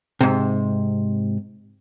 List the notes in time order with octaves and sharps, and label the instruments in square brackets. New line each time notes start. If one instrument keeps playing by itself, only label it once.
[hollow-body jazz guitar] G#2 C3